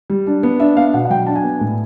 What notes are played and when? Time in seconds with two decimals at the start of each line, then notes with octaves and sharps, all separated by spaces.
0.10 G3
0.27 D4
0.43 B3
0.60 D4 E5
0.77 B3 F5
0.94 B2 F#5
1.05 F#5
1.10 F#3 G5
1.27 D4 A5
1.36 G#5
1.44 B3
1.61 A2